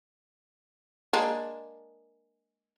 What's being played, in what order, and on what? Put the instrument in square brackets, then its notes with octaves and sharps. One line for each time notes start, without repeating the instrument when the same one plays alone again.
[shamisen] G#3 A#3 D4